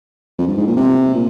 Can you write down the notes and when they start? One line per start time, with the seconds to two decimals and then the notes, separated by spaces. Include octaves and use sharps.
0.38 F2
0.48 G2
0.57 G#2
0.67 A#2
0.76 C3
1.14 A#2